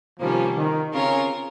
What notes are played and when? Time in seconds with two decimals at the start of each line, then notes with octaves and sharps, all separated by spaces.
0.19 C3 D#3 F3 G3 A#3 C#4
0.56 D#3
0.92 C#3 C4 F4 A#4 C#5